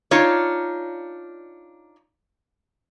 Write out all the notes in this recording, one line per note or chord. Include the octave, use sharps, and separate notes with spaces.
D4 D#4 F4 C#5